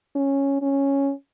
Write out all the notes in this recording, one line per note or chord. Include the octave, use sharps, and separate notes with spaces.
C#4
C#4